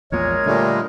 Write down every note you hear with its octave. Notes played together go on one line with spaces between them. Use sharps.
A#1 E2 A#2 G#3 A#4 C#5
A#2 D3 G3 A3